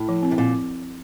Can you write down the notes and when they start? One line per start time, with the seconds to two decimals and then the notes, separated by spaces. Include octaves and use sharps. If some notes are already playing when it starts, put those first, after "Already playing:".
Already playing: A2
0.09 F3
0.23 C4
0.31 C3
0.38 A#2 C4